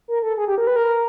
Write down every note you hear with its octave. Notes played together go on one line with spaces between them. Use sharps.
A#4
A4
G#4
G4
A#4
B4
A#4